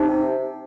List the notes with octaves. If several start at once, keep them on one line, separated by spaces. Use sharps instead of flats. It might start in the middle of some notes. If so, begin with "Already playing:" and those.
Already playing: C3 D#4